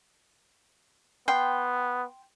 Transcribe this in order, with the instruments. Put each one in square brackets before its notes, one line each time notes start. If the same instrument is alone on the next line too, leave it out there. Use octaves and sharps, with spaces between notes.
[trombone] B3 [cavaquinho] G5 C6